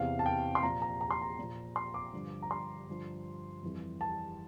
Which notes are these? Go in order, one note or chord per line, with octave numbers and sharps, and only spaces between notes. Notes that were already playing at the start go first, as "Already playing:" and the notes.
Already playing: E2 C3 E3 F5
A5
G5
C6
A#2 F3 A#5
A#5
A#5
C6
A#5
A#2 F3
C6
D6
G2 D3 F3
A#5
C6
G2 D3 F3
F2 E3 G3
A5